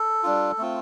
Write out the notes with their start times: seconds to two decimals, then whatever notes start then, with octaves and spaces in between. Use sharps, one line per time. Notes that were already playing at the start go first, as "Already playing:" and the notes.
Already playing: A4
0.23 G3 D4 F4
0.58 A3 C4 F4